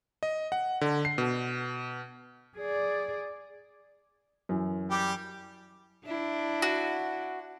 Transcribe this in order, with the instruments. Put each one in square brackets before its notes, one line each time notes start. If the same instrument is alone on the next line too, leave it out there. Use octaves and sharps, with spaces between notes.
[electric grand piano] D#5
F#5
D3
C7
B2
[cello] G#4 D5
[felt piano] F#2 E3
[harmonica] G3 G4
[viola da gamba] D4 E4
[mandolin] F#4